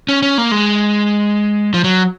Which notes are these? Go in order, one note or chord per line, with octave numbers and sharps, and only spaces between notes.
C#4
C#4
A#3
G#3
F3
F#3